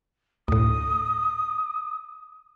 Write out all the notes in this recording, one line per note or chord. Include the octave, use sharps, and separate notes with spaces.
D2 A2 D#6